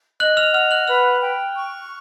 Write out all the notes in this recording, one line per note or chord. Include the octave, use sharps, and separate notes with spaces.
D#5 F#6 F#7
F6 F7
F#5 F6 F7
F#6 F#7
B4 F6 F7
G5
C#6